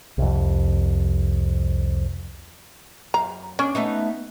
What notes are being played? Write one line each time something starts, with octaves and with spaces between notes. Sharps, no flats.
C2 F2
F#2 F5 A#5
C#4 D4
A3 B3 D#4